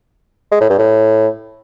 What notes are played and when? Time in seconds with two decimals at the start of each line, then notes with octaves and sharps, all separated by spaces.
0.52 G#3
0.61 A2
0.70 G2
0.79 A2